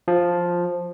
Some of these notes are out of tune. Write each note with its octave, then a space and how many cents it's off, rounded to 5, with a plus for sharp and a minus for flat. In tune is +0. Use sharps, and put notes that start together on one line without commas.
F3 +5